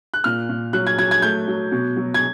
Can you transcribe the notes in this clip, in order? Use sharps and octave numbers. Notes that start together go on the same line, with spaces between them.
F#6
A#2 F6
A#2
F#3 F#6
G#6
F#3 G#6
G#6
A3 G6
F#3
B2
F#3
G#6